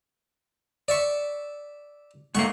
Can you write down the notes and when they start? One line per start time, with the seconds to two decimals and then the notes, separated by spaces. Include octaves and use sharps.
0.88 D5 E5 C#6
2.35 G#2 A3 A#3 F#5 C#6